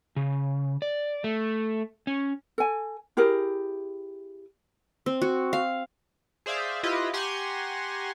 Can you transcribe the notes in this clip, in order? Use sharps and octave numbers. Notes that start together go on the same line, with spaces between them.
C#3
D5
A3
C#4
A4 G#5
E4 G4 G#4 A#4
C4
F#4
F5
G#4 C5 D5 E5 F5
E4 F4 G4 B4 D#5
G4 F#5 G#5 A#5 C6 C#6